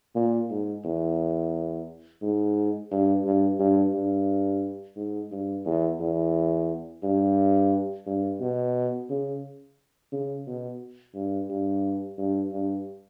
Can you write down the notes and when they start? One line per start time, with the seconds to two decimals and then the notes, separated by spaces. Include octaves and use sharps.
0.15 A#2
0.50 G#2
0.85 E2
2.22 G#2
2.91 G2
3.25 G2
3.60 G2
3.94 G2
4.96 G#2
5.32 G2
5.66 E2
6.00 E2
7.03 G2
8.07 G2
8.41 B2
9.10 C#3
10.12 C#3
10.47 B2
11.15 G2
11.50 G2
12.18 G2
12.53 G2